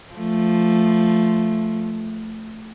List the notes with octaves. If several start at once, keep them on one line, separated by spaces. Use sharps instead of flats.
F3 A3